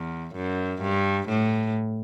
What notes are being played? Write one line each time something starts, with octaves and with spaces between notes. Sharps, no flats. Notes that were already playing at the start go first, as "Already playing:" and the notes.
Already playing: E2
F#2
G2
A2